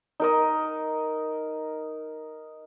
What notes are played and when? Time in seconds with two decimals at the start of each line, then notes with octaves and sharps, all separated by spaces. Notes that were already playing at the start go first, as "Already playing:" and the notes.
0.20 D#4 A#4 D#5